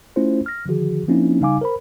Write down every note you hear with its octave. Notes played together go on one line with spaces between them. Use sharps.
A3 C#4 E4 F4 C5
F6 A#6
D3 D#3 F3 F#4 G#4
F3 A#3 C4 C#4 D#4 E4
C#3 G3 D#4 F5 G#5 D6
A#4 C5 B5